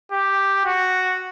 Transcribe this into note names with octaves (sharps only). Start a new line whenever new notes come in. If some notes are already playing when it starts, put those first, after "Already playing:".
G4
F#4